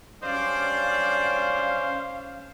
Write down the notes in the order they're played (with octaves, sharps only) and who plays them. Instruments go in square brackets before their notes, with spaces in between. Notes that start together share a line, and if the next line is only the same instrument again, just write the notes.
[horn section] G2 F#3 D5 [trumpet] C#4 [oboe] C5 [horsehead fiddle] F5